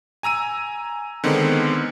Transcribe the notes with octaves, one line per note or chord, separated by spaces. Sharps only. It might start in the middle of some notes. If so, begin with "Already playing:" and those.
G#5 A#5 E6 D#7
D3 D#3 G#3 B3 C4